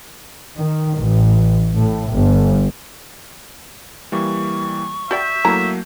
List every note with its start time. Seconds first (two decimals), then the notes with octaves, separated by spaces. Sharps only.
0.58 D#3
0.99 A1
1.77 A2
2.13 G1
4.12 E3 G3 A#3 C#6
5.11 F#4 D5 E5 G5 G6
5.45 F#3 A3 A#3 E4 A#5